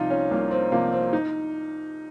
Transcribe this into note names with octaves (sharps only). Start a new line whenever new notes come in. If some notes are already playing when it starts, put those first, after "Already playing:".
Already playing: C2 C3 F3 D#4 F4
C#4
C2 A#3
C4
C3 F3 A#3
C4
D#4